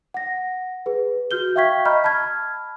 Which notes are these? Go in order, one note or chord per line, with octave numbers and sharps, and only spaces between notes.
F#5 A#6
G#4 B4
F#4 F6 G6 G7
E5 F5 G5 C#6 G#6 B6
D#5 A#5 B5 C#6 F6 G6
A5 B5 F6 G#6